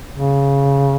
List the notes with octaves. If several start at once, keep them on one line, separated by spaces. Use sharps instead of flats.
C#3